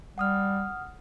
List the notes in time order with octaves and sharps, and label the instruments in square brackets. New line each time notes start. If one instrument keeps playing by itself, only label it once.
[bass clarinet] G3 [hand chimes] F#5 D#6 F6